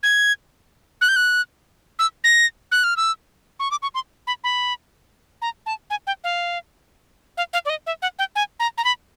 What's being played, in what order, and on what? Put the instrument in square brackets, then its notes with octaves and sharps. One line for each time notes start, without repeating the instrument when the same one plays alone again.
[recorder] G#6
F#6
G6
F#6
E6
A#6
F#6
F6
E6
C#6
D6
C#6
C6
B5
B5
A#5
A5
G#5
G5
F5
F5
F5
D5
D#5
E5
F#5
G5
G#5
A#5
A#5
B5